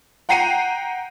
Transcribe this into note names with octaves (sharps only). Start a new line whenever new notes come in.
F#5 G5 A#5 C7 C#7 D#7